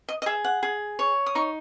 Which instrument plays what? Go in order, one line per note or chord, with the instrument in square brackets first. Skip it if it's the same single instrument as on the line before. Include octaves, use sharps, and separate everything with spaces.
[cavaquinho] D#5
D#5
G#4 E5
F#5
G#4
C#5
D#6
D#4 C#6